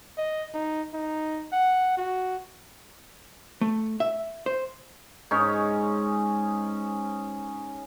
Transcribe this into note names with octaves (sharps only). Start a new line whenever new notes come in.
D#5
D#4
D#4
F#5
F#4
A3
E5
C5
G#2 C#4 D#4 C#5